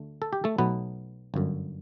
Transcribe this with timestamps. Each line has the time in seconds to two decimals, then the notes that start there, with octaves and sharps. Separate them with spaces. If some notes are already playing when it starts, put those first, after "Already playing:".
Already playing: D2 D3 A3
0.22 A4
0.33 G4
0.44 A3 A4
0.58 B1 B2 F#3 A3 B3 B4
1.34 G1 F#2 D3